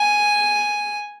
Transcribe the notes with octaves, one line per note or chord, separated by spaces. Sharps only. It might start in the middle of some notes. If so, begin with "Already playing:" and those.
Already playing: G#5